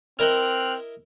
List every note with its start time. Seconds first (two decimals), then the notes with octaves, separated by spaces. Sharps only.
0.19 C4 E4 A#4 D#5 F6 F#6